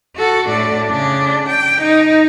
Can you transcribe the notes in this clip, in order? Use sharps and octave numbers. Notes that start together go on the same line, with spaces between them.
F#4 A4
A2 D4
C#3 D4
G5
D#4